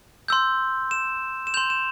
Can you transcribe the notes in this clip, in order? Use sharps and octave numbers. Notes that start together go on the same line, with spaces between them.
C6 E6 G6
E7
E7
C6 G6 F7
E7